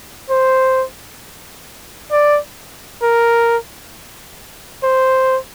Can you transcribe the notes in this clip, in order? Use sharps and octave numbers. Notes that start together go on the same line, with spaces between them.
C5
D5
A#4
C5